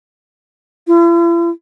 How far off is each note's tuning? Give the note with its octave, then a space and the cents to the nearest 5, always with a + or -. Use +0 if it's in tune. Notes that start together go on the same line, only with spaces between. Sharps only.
E4 +45